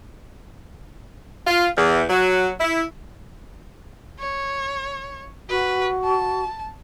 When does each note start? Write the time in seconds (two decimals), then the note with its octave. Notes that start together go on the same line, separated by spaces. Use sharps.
1.47 F4
1.78 E2
2.09 F#3
2.60 E4
4.20 C#5
5.50 F#4 B4
6.04 A5